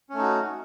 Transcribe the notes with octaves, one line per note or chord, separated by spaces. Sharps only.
A3 C#4 D#4 F#4